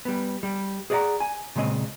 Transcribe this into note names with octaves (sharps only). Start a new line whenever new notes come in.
G3 B3
G3
G#4 B4 D5 D#5 F#5 A#5
G#5
A#2 C#3 G#3 C4 D#5